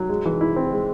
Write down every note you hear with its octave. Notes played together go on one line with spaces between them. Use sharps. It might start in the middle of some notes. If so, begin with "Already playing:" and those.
Already playing: F#3
G#3
E3
E4
C4
G#3